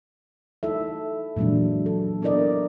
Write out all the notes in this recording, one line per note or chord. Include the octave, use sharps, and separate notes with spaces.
D#4 E4 A4 E5
A#2 E3 F#3 G#3 D4
A4
B3 D4 E4 A#4 D5 D#5